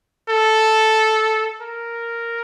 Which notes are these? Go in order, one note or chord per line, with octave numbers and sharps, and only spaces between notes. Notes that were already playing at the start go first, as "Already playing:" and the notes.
A4
A#4